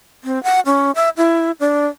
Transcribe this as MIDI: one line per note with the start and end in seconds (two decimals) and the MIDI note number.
0.24 0.41 60
0.43 0.60 78
0.66 0.91 61
0.95 1.09 76
1.17 1.51 64
1.60 1.87 62